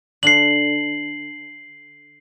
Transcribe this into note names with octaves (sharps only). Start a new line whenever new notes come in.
D3 D4 C7 F#7